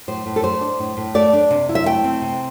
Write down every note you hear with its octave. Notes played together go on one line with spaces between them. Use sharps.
A2 C5
A2
A4
A3 C5
D4
A2
A2
A3 D5
D4
C3
E4
E5
A3 G5
C4
C3